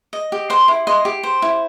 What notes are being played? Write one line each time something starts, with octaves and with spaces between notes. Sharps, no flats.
D#5
G4
C5 C6
E4
D#5 C6
G4
C5
E4